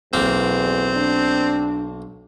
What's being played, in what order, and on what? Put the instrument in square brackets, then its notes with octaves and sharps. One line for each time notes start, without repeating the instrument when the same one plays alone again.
[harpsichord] B1 A#3 [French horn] E2 [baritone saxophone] C4
[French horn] D4